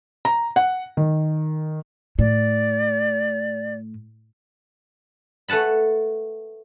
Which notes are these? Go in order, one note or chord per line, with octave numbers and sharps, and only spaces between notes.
A#5
F#5
D#3
A2 D5
A3 B4 F#5 A5 B5